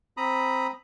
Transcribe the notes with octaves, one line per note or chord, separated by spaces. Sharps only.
C4 A#5 B5 D#6